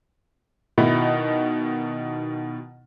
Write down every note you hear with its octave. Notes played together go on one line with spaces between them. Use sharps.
B2 D#3 D#4 E4